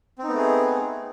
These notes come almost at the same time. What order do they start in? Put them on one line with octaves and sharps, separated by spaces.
C4 D#4 B3 A3 G#4